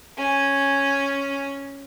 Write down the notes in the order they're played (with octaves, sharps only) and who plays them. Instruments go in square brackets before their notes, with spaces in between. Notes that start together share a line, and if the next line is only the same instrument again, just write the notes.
[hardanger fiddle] C#4 G#5